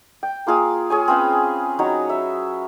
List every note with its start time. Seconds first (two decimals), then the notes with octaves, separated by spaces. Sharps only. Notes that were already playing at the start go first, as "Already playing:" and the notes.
0.23 G5
0.47 A#3 F4 G#4 F5
0.90 G#4 C#5 G#5
1.08 C4 C#4 B4 F5
1.79 F#3 D#4 C#5
2.09 E5